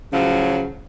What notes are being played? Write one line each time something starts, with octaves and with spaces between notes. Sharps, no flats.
A2 C#3 F3 F#3